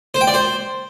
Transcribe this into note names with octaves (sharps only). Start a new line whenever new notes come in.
C5
G5
D5
C5